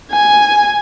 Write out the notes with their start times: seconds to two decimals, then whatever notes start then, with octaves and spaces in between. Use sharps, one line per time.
0.12 G#5